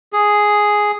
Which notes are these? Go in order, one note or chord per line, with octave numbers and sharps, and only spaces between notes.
G#4